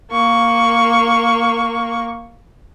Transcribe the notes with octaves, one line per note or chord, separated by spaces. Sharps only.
A#3 C#6